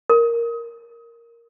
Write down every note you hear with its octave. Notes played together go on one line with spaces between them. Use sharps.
A#4